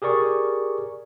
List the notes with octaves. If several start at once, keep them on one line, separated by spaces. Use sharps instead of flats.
G4 G#4 A#4 D5 C#6